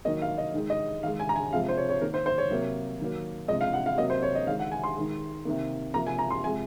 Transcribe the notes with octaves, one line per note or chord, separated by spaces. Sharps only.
D#3 F#3 A#3 D#5
F5
D#5
D#3 G#3
D#5
D#3 G#3 F5
G#5
A#5
G#5
C3 F3 G#3 F5
C5
C#5
C#5
D#3 A#3 A#4
C5
C5
C#5
C3 F#3 A#3
D#3 F#3 A#3
C3 F3 G#3 D#5
F5
F#5
F5
C3 F#3 A#3 D#5
C5
C#5
D#5
D#3 G#3 F5
F#5
G#5
C6
D#3 G#3
C3 D#3 A#3
C3 F3 A#3 A#5
G#5
A#5
C6
C3 F3 G#3 G#5